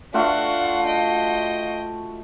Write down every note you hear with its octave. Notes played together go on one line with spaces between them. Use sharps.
A3 D4 F4 F#4 F5 F#5
D#5 G5